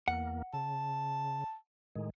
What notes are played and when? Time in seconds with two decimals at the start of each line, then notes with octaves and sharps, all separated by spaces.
0.08 E2 A#3 F#5
0.53 C#3 A5
1.96 A2 D#3 G#3